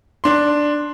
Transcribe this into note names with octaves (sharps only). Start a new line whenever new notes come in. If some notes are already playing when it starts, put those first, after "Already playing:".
D4 C6